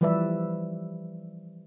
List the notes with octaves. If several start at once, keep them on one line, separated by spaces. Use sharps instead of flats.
E3 F3 G3 B4 D5 E5